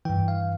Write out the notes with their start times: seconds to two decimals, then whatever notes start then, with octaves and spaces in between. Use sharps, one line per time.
0.05 G2 E3 G5
0.28 F5